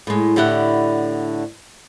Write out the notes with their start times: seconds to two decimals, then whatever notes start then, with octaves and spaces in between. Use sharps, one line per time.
0.07 A2 G#3
0.36 A2 D3 E4 G4 E5 F#5